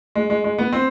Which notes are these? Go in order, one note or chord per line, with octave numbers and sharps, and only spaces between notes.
G#3
G#3
G#3
B3
C4